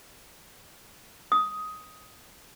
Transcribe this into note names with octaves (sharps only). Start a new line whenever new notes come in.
D#6